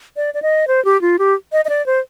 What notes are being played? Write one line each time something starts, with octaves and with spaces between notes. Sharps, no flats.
D5
D5
D#5
C5
G4
F4
G4
D#5
D#5
D5
C5